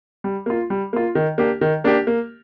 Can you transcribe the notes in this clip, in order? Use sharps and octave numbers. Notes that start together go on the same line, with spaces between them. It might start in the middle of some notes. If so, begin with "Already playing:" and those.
G3
A#3 F4
G3
A#3 F4
D#3
A#3 D4 G4
D#3
A#3 D4 G4
A#3